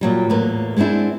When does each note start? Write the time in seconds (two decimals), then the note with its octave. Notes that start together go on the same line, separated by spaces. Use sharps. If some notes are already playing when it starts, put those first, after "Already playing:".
0.01 A#2 F#3 G3
0.30 E2 A2 A#3 B4
0.77 G#3 B3 C4 D4 E4